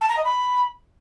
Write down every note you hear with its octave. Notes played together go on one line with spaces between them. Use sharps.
A5
A#5
D#5
B5